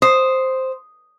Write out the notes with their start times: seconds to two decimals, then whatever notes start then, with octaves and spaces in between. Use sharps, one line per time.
0.02 C5 D#6 C7